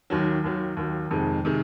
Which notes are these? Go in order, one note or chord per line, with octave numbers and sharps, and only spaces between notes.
D#2 D#3 F#3
D#2 D#3 F#3
D#2 D#3 F#3
F2 C3 D#3 G#3
C3 D#3 G#3